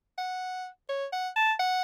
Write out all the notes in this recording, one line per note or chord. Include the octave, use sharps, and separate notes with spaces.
F#5
C#5
F#5
A5
F#5